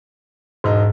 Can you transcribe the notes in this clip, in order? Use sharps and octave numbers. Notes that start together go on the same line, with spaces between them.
E1 G#2 D#4